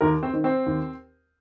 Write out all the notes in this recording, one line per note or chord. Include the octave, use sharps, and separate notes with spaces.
D#2 A#4
C4 C5
D#3
C4 C5
D#2